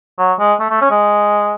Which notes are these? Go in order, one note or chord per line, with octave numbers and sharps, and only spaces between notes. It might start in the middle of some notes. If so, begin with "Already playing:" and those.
F#3
G#3
A3
A3
C#4
G#3